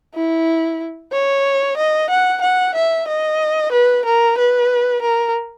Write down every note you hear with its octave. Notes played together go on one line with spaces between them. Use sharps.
E4
C#5
D#5
F#5
F#5
E5
D#5
B4
A#4
B4
A#4